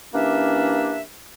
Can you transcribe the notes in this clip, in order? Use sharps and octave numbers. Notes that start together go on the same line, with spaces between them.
E3 A#3 C#4 D4 G4 E5